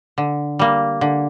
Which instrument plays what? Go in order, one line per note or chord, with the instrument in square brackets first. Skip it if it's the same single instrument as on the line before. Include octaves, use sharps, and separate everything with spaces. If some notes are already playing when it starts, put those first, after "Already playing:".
[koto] D3
G3 A#3
D3